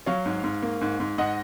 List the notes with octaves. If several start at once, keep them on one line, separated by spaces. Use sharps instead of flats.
F#3 C#5 F5
G#2
G#2
A#3
G#2
G#2
G#2 D#5 F#5